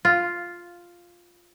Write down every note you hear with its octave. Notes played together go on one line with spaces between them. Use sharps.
F4